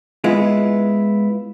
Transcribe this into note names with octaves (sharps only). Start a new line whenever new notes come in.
G#3 B3 E4 F4